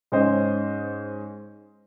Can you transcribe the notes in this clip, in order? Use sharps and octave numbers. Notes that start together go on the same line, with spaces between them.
G#2 C#4 C5 D#5